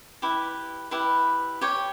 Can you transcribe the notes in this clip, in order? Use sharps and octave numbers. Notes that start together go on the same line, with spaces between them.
E4 G4 B4
E4 G4 B4
G4 C#5 G5